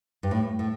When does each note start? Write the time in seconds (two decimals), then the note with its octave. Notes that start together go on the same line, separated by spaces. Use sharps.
0.23 G2
0.31 A2
0.59 A2